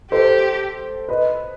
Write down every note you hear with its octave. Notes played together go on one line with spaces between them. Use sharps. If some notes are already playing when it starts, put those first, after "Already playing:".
G4 A4 C5
B4 D#5